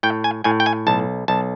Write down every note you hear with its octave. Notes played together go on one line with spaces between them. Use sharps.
A2 G5
G#5
A2 G#5
G5
G#5
B1 A5
B1 A5